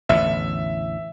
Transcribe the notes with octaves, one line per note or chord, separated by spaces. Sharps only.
A1 E2 D3 E5